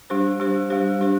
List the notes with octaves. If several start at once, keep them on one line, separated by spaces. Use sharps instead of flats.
G3 D4 G4 C5
G3 D4 G4 C5
G3 D4 G4 C5
G3 D4 G4 C5